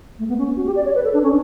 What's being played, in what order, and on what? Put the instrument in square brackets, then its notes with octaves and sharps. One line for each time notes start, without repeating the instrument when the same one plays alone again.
[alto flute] A3
B3
C#4
F#4
G4
D5
C#5
B4
A4
D4
C#4